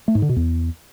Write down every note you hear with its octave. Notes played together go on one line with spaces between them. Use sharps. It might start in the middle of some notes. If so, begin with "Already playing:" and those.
A3
G#2
D3
B2
E2